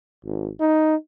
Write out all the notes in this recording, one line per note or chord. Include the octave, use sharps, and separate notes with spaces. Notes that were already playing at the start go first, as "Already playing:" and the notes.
G#1
D#4